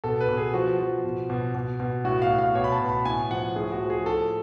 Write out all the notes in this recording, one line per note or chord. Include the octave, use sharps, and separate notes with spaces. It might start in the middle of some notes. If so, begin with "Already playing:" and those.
B2 A4
B4
B2
G#4
F3 F#4
F3
B2
B2
B2
B2
A2 F#4
F5
A2
F5
B2 C#5
B5
A5
B2
B5
A2 G#5
F3 F#5
A2 G#4
F#4
F3
G#4
A2 A4